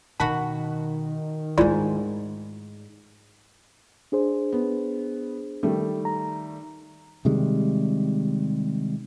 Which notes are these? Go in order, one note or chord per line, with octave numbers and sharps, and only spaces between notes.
B2 D#3 F#4 F#5 A5 B5
G#2 G#3 A3 E4 F4 D5
D4 G#4 C5
B3
D#3 G3 A3
A#5
C3 D#3 G3 G#3